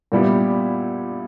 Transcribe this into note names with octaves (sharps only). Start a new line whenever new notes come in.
A#2 G3 B3 E4 G4